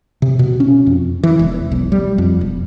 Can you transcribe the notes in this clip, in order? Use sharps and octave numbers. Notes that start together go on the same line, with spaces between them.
C3
B2
C#4
F2
E3
E1
B1
G3
F2
E1